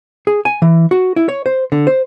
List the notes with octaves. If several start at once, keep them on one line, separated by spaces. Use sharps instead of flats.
G#4
G#5
E3
F#4
E4
C#5
C5
D3
C5